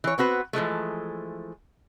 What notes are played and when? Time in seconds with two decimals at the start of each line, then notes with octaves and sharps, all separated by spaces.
0.04 E3 C#5
0.18 B3 C4 F#4 B4
0.53 E3 F3 G#3 A3